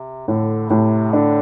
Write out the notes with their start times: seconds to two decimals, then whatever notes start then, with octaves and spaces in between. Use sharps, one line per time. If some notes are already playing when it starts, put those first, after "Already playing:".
Already playing: C3
0.28 A2 D3
0.70 A2 C3
1.13 D3 D4